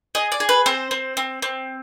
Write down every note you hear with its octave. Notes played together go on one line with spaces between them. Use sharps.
G#4 D#5
D5
G#4
B4
C4 C5
C4
C4
C4